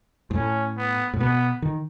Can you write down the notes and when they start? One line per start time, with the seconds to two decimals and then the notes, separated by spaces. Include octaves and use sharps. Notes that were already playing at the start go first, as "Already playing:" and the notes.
0.31 G#2
0.35 A2 C#4
0.77 B3
1.14 A2
1.20 B2 B3
1.62 D#3